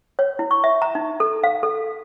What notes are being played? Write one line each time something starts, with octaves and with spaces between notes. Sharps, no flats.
C#5
E4
C#6
E5
A#5
D#4
A4
F5
A4